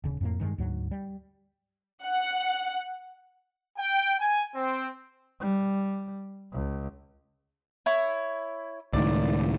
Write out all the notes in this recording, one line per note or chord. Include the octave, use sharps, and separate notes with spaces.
D#1 C#3
F2 A2 A#3
G2 D#3 F#3 G#3
D2 G#2 F#3
G3
F#5
G5
G#5
C4
G3
C#2
E4 C#5
C#2 A2 D#3 D5